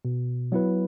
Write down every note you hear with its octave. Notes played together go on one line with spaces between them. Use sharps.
B2
F#3 B3 E4 B4